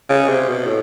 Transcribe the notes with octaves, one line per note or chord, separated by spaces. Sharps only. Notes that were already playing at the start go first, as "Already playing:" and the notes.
C#3
C3
B2
A2